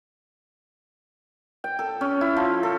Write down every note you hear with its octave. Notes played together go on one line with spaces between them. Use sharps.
G5
A4
C#4
E4
F3
A4